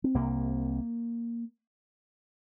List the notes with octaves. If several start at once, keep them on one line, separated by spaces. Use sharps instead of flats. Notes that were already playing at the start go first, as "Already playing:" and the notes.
C4
C2 C3 A#3